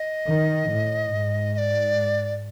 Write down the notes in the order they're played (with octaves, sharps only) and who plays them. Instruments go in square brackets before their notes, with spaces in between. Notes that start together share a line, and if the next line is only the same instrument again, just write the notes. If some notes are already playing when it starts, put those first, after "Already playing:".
Already playing: [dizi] D#5
[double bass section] D#3
A2
G#2
[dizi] D#5
D5